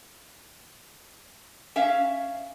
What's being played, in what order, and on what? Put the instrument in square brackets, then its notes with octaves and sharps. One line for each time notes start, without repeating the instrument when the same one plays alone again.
[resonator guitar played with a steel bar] C#4 E5 F5